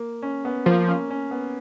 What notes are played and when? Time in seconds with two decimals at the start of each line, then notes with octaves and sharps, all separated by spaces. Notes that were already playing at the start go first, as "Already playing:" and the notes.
Already playing: A#3
0.23 C#4
0.45 B3
0.66 F3 A#3
0.88 C#4
1.11 C#4
1.31 B3